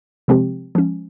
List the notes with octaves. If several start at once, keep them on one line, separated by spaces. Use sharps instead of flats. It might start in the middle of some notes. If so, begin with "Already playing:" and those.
C3 F3 G#3 C4 G4
F3 G#3 C#4